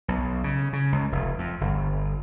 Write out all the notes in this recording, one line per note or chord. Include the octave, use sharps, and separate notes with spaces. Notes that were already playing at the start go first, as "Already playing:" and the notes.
B1
C#3
C#3
C#2
F1
F2
G1